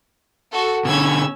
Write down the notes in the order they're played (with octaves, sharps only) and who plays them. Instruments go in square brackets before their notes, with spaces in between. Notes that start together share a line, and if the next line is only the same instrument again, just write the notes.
[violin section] F#4 A4
[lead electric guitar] B2 D3 [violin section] C#4 E6 G#6